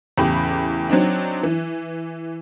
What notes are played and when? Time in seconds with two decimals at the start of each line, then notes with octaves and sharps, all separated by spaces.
0.18 E2 A2 C#3 G4 B5
0.90 F#3 C4 D4 D#4
1.43 E3